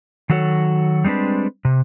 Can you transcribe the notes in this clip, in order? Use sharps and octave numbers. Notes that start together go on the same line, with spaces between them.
D#3 F#3 F#4 A4 C#5
G3 G#3 C4 D4 B4
C3